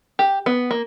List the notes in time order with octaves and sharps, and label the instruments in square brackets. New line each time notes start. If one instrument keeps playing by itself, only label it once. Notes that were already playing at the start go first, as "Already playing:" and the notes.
[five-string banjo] G4
B3
A#3